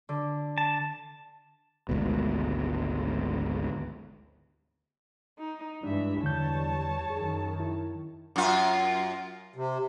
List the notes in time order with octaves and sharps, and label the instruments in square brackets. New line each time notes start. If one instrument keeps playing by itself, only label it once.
[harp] D3
[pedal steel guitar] A5
[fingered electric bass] G#1 D2 G#2 B2
[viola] D#4
[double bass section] G2 [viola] E3 E5 [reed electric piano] G#3 D4
[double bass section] E2 G3 [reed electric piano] D3 G6 [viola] C#5 A5
[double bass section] F#2 D#3 [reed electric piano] G#4
[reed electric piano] E4
[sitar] F#2 F4
[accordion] C3